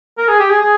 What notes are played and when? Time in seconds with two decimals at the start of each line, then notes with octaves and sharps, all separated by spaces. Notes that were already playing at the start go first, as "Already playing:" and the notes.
0.18 A#4
0.28 G#4
0.39 G4
0.50 G#4
0.61 G#4